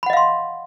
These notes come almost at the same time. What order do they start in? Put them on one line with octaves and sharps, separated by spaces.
B5 F#5 D#5 F5 C6